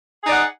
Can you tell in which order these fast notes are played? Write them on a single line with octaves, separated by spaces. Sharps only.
G#4 D#4 D5 F#5